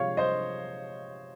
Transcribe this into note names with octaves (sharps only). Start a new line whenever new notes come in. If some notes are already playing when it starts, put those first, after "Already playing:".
Already playing: C3 F3 G#3 C#5 F5
C5 D#5